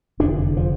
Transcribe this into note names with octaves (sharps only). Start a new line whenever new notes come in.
F1 E2 D3 D4
F3